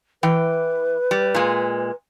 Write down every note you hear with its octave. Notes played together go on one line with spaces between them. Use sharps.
E3 B4 G5
G3
A#2 G#3